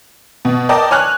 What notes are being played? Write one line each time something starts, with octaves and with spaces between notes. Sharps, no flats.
B2
A#4 D5 D#5 G5 A5
C#5 G#5 F6 F#6